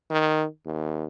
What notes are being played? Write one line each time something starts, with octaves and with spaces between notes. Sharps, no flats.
D#3
D#2